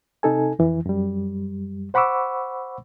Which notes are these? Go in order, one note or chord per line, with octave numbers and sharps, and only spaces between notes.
C3 D#4 A4 G#5
F2 E3
F#2 G3
C5 F#5 B5 C#6 D6 E6